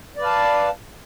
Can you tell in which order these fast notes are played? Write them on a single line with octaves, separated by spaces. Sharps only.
D5 B4 F5 A5